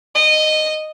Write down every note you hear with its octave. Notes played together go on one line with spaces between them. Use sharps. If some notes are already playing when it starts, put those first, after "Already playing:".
D#5